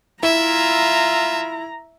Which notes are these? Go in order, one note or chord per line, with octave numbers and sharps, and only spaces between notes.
E4 F4 E5 A#5